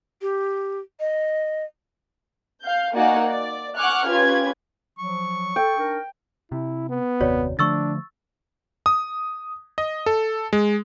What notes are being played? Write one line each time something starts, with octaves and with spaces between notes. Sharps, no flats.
G4
D#5
F5 G6
A#3 D#4 F#4 D5 F#5 G#5
D5
F#5 G#5 C#6 D6 F6 F#6
C#4 F4 G4 B4 G#6
F3 F#3 C#6
A4 G5
D4 D#4 A#4
C3 E4
B3
F#1 D#2 C3 F#4 C#5 D5
D3 F3 A3 D4 C#6 E6 A6
D#6
D#5
A4
G#3